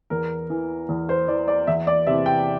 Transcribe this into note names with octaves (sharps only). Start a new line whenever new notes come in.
E2 A#4
E3
E2
C5
E3 D5
D5
E2 E5
D5
C3 E3 E5
G5